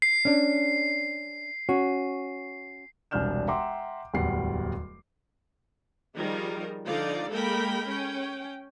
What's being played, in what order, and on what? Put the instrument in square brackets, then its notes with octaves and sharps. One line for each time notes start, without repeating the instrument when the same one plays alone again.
[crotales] C7
[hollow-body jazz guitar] C#4 D4
C#4 F#4
[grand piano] E1 C2 D4 F6 G6 E7
E5 F#5 G5 A#5 C6 D6
D1 E2 G3 F#5 C7
[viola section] D#3 F3 G3 G#4 A#4
D3 F3 D#4 D5 F5
G#3 A#3 A4 A#4 G5 B5
C#4 G5